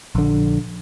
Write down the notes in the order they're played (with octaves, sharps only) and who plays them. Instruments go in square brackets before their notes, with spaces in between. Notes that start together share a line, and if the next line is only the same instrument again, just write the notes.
[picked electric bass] A#1 D3